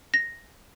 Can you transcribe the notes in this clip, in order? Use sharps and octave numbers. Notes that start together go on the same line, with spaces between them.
A#6